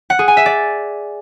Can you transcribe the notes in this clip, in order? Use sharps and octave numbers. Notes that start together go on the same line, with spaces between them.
F#5
G#4
G#5
E5
D5